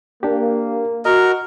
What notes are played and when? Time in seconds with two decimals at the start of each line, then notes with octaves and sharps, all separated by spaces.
0.23 A#3 D4 G4
1.05 F#4 A#4 D#5